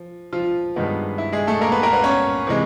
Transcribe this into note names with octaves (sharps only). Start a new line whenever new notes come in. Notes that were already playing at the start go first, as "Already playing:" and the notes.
Already playing: F3
F3 F4
G2 D#3 G#3 B3
E4
G#3 G#4
A3 A4
A#3 A#4
B3 B4
A#3 A#4
B3 B4
C#4 C#5
C3 E3 G#3